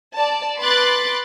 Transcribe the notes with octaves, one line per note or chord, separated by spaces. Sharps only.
D5 A5
B4 B5 C6 D6 F#6 A6